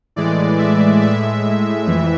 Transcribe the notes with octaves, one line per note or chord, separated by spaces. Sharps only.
A2 E3 G#3 D5
E5
A2 G#3 E5
F2 E3